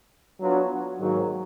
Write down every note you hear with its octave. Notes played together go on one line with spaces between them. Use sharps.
F#3 B3 D4 F4
G#2 D#3 F#3 A#3